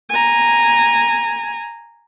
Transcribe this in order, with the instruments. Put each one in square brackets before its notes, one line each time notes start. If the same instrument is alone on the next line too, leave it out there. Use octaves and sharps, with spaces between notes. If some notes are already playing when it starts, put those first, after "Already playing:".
[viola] G#5 A#5